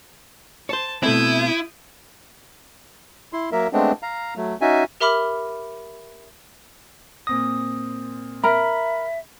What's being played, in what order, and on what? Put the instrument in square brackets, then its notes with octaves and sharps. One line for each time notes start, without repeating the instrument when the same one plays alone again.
[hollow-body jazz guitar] C5 C#5 [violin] A5
[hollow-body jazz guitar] B2 A3 C4 [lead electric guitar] E4 [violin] D#6 G6
[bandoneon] E4 C6
F#3 A#3 A#4 E5
G#3 A3 B3 C4 D4
F5 A#5
F#3 A3
C#4 D#4 F#4 E5 G#5
[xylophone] G4 A#4 E5 B5 D6 F6
[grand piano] A#2 C4 A#6 [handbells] D#6
[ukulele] A#4 A#5 [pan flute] E5 [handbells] B5